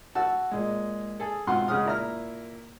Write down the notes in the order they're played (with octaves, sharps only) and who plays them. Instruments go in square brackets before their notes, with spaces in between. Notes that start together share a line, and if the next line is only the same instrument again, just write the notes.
[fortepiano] F#4 A5 E6
A#2 G#3
G#4 A4
G#2 B2 C4 F4 F#5 C6
C#3 G#3 F#5 D#6 F6
A#2 E4 A#5 F6